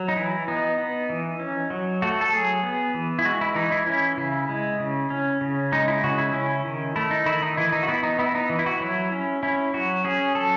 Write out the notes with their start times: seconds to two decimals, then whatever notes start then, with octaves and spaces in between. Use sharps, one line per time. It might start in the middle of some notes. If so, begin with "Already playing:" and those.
Already playing: F#3
0.08 D#4
0.16 E3 E4
0.48 B3 D#4
0.78 B3
1.10 E3
1.39 C#4
1.70 F#3
2.02 A3 F#4
2.21 A4
2.33 F#3 G#4
2.63 B3
2.94 E3
3.19 E4
3.25 G#3 F#4
3.41 E4
3.55 E3 D#4
3.72 E4
3.87 C#4 E4
4.17 C#3 E4
4.49 G#3
4.80 C#3
5.10 C#4
5.41 C#3
5.72 G#3 D#4
5.88 E4
6.04 C#3 F#4
6.18 E4
6.34 C#4 E4
6.65 D#3
6.96 A3 E4
7.11 D#4
7.26 D#3 E4
7.42 D#4
7.57 E3 E4
7.72 D#4
7.83 F#4
7.88 B3 E4
8.03 D#4
8.19 B3 E4
8.35 D#4
8.50 E3
8.59 E4
8.66 F#4
8.80 F#3 E4
9.12 C#4
9.43 C#4 E4
9.74 F#3 F#4
10.04 C#4 G#4
10.35 F#3 A4